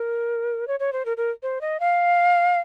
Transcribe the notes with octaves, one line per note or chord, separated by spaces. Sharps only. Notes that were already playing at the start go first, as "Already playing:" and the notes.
Already playing: A#4
C#5
C#5
C5
A#4
A#4
C5
D#5
F5